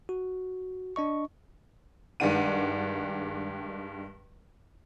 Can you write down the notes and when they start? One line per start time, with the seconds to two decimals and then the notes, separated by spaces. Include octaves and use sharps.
0.09 F#4
0.96 D4 D#5 C#6
2.20 G2 D#3 G#3 D4 F#5 D#7